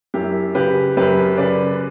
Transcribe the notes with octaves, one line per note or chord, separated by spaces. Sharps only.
F#2 E4 G4
C#3 G4 B4
F#2 G4 B4
C#3 B4 D5